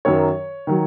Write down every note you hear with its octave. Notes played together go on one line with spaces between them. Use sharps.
F#2 D#3 F#3 C#5
D#3 F#3